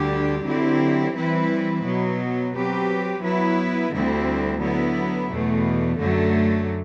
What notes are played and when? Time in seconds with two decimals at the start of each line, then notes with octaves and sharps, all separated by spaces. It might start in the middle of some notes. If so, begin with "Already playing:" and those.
Already playing: D2 D3 G3 D4 G4
0.46 D3 F#3 C4 E4 G4
1.15 E3 G3 C4 E4 B4
1.85 B2 F#3 B3
2.54 F#3 C4 G4 B4
3.23 F#3 B3 E4 B4
3.92 D2 D3 G3 C4 E4
4.61 D3 F#3 B3 E4
5.30 E2 B2 A3
5.99 F#2 D3 F#3 A3